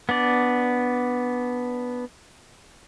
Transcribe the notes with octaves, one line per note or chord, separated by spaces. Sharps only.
B3 D4 D5